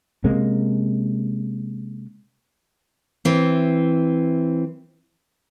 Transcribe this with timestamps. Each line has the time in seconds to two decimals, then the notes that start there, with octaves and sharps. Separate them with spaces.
0.24 C3 G#3 A#3 C#4
3.25 E3 C4